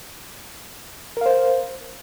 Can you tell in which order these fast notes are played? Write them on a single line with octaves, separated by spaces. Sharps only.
A#4 F5 C5